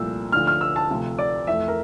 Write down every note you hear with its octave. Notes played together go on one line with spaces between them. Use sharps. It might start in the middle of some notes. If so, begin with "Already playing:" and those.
Already playing: C2 A#2 F3 A3 E6
D2 D3 F3 F6
F6
E6
A5
D2 C3 F3 A3
D5
F2 E3 A3 E5
A#4